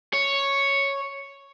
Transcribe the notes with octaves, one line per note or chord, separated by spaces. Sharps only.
C#5